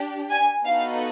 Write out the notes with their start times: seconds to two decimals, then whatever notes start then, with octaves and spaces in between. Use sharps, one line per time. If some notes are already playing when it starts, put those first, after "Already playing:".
Already playing: D4 G4
0.30 G#5
0.66 B3 D#4 F#4 A4 F5